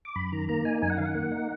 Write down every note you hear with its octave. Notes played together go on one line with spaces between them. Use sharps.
D6
F#2 B5
D#3 A#5
A#3 A#5
D#4 G#5
F#2 G#5
F#5
D#3 F5
F#5
A#3
D#4